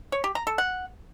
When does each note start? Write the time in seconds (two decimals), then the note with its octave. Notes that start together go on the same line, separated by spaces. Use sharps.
0.12 C#5
0.24 G4
0.35 A#5
0.47 A4
0.58 F#5